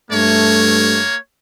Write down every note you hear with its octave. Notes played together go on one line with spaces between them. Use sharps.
G2 A3 A#3 C#5